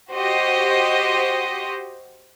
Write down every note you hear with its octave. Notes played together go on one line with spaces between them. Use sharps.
F#4 G4 C5 D#5